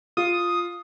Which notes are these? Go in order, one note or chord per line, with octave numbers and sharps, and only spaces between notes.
F4 D#6